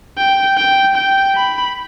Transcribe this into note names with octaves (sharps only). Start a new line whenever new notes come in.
G5
G5
G5
B5